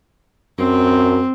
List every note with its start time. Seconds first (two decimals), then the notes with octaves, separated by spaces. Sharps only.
0.59 F#2 C4